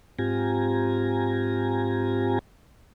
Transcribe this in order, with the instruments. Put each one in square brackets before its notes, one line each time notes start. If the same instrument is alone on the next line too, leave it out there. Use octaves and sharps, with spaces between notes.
[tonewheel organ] G#2 C4 F4 G4 G#5 A#5